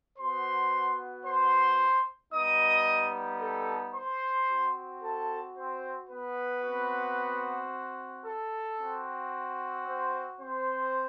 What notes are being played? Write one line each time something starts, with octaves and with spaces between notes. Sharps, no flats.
B3 F#4 C5 C6
C5 C6
G3 B3 D#4 D#5 D#6
A4 A5
C5 C6
C4 F#4
A4 A5
C4 C5
B3 B4
C4 F#4
A4
C4 F#4
C4 C5
C4 C5